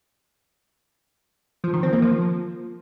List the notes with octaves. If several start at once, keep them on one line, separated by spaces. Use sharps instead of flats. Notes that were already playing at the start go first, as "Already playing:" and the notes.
F3
D#3
C4
A#3
F3